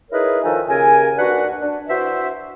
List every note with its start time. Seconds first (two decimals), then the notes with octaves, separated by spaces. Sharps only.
0.11 D#4 E4 G#4 A#4 B4 C#5
0.43 D#3 F3 D#4 F4 A4 G#5
0.68 D#2 C#3 A#4 G#5
1.17 D#2 D4 F#4 B4 F#5
1.61 D4
1.89 E3 F#4 C5 E5